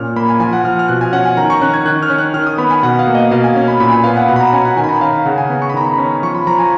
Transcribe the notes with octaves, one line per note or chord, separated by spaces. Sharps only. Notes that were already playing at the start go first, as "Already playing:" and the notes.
Already playing: A#2 C#4 F6
A#3 B5
G#5
F3 G#5
F#5
F3 F6
F6
B2 F#6
G#5
C#4 F#5
G#5
D#3 A#5
C#6
C#4 F#6
G#6
D#3 F#6
F6
C#4
F#6
D#3 F6
D#6
B3 B5
G#5
B2 F#5
F5
A#3
D#5
B2 F5
G#5
C#4
B5
A#2 B5
G#5
B3 F5
F#5
B2 F#5
B5
A#5
C#4 G#5
F#5
D#3 G#5
B5
A#5
C#4 F5
F5
C#3 F#5
G#5
B3
C#6
B5
D#3 A#5
B5
C#4
F3 C#6
B5
F3 A#5
G#5